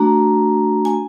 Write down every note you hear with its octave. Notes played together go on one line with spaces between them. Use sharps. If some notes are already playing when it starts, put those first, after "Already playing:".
Already playing: A3 D4 F#4 A#5
G#5